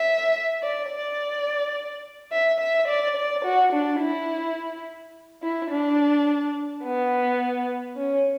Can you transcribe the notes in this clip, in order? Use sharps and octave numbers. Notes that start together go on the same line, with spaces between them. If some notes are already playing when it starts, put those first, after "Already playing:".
Already playing: E5
D5
D5
E5
E5
D5
D5
F#4
D4
E4
E4
D4
B3
C#4